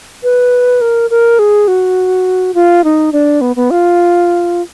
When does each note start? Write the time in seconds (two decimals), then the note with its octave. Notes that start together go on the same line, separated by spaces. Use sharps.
0.23 B4
0.81 A#4
1.10 A#4
1.39 G#4
1.68 F#4
2.54 F4
2.84 D#4
3.13 D4
3.41 B3
3.56 B3
3.71 F4